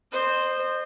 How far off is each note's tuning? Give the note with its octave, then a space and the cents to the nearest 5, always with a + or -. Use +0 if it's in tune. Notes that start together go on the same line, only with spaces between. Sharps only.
C5 +0 D#5 -30